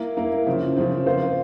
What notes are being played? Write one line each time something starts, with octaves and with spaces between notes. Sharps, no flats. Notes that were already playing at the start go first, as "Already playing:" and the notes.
Already playing: A#3 E4 A#4
A#3 E4 A#4
C#3 F3 C4
C#3 F3 C4
A#3 F4 C5